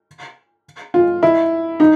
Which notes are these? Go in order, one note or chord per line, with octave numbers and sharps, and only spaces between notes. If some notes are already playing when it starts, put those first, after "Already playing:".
F4
E4
D#4